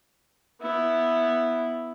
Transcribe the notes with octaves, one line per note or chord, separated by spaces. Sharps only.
B3 E4